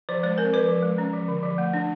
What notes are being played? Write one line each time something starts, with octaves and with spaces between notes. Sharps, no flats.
F3 C5
G#3 C5
C4 A#4
F3 B4
F3
G#3
C#4
F3
D3
F3
A3
D4